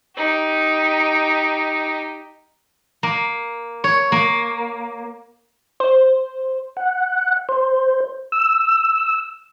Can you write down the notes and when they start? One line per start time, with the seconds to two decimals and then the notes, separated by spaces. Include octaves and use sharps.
0.16 D#4 G4
3.03 A#3
3.84 C#5
4.12 A#3
5.80 C5
6.77 F#5
7.49 C5
8.32 E6